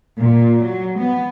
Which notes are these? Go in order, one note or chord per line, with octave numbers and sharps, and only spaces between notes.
A#2
F#3
B3